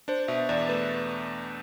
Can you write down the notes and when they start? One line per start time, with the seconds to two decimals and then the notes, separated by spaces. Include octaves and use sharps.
0.08 D4 C5
0.28 B2 E5
0.49 E2 D5
0.69 A3 B4